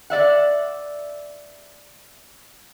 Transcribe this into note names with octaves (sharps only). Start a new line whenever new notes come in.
D5 E5 F#5